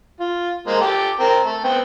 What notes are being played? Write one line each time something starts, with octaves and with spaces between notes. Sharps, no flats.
F4
G#3 A#3 C5
A4 G5 D6
C4 A#4
A3
B3 C4 G5